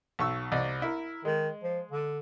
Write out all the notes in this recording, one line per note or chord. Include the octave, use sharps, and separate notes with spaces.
B1 C#6 E6
C2 D5 D#5
E4 A#4
D#3 G#3
F3
D3